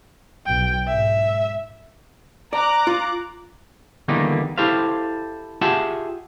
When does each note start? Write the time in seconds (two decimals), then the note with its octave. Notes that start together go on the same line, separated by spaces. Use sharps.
0.46 B1 G5
0.87 G#2 E5
2.53 D5 A#5 D6 F#6
2.87 F4
4.08 E2 D3 D#3 G3 A#3 D#4
4.58 E4 G4 A4 C5 F5
5.61 F4 G4 G#4 E5 F#5 A5